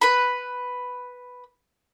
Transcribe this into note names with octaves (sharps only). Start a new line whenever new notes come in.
B4 B5